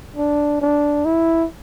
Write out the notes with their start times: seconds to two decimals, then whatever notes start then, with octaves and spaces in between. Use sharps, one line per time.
0.16 D4
0.62 D4
1.06 E4